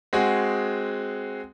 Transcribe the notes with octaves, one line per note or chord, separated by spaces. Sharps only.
G#3 C4 F#4 G#4